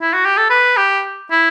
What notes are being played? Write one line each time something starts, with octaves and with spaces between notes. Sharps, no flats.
E4
F#4
G4
A4
B4
G4
E4